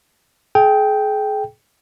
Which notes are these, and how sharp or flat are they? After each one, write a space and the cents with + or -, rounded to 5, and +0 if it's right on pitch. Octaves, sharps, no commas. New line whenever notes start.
G#4 +35 G5 +0